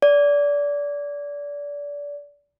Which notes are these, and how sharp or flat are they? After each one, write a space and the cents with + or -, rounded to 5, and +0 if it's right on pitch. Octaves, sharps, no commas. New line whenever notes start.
D5 -25